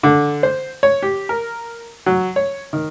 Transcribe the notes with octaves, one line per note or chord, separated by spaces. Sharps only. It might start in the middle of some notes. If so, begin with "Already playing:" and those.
D3
C5
C#5
G4
A#4
F#3
C#5
D#3